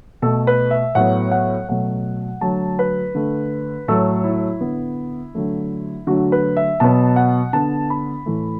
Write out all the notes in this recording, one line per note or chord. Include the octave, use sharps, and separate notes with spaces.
B2 A3 A4
B4
E5
A2 F#3 B3 F#5
F#5
B2 F#3 A3 F#5
D3 F#3 A3 A5
B4
D3 A3
A2 F#3 A3 A4
E4
D3 B3
D3 F#3 A3
D3 F#3 A3 F#4
B4
E5
B2 F#3 B3 A5
F#5
D3 B3 A5
B5
A2 E3 A3